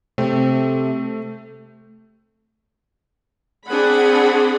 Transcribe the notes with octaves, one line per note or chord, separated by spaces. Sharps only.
C3 A3 C4
C4 D4 G#4 F#5 B5